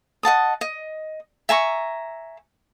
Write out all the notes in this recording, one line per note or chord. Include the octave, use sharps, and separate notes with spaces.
D#5 F#5 A5 D#6
D#5
E5 G#5 A#5 C#6